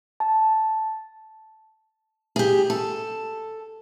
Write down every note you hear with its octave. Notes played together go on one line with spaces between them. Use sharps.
A5
G4 G#4
A4